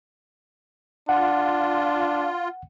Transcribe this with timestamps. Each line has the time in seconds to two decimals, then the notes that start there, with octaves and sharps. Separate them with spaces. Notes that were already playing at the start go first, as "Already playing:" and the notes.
1.09 D4 F4 F#5